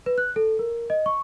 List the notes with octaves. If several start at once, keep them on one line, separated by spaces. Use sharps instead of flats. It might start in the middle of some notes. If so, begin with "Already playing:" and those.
B4
F#6
A4
A#4
D#5
C#6